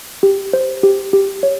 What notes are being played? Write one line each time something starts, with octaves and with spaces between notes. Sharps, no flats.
G4
C5
G4
G4
C#5